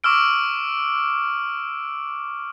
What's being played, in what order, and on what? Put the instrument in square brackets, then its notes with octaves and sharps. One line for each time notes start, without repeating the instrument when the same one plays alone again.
[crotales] C#6 D6 E6 F6 D7